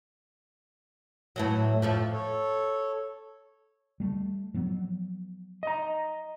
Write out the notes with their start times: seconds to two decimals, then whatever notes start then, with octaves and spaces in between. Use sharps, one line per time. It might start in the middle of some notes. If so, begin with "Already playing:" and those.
1.36 A2 E3 F#3
1.82 F2 A2 F3
2.12 A4 C#5
4.00 G3 A3
4.54 F3 F#3 B3
5.63 D#5 A#5